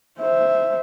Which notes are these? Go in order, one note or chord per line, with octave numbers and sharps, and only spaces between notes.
C5 E5